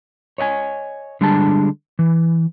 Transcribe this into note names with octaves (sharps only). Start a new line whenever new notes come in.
C#5 D#5 F#5 G#5
D3 G3 G#3 D4 A5
E3